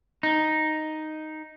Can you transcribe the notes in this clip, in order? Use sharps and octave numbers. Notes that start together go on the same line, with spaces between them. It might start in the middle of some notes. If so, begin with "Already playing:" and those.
D#4